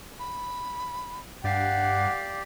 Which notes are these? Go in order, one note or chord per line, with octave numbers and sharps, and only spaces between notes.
B5
G2 G4 D5 F5 F#5